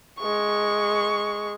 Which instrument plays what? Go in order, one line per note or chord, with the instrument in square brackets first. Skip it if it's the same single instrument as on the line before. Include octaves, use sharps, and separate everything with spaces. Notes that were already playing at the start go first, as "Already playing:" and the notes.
[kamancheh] G#3 C#6